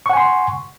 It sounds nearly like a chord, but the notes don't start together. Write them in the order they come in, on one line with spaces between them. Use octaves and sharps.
C#6 F#5 G#5 C6